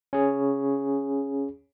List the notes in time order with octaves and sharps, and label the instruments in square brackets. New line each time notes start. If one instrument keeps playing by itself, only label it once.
[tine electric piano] C#4 G#4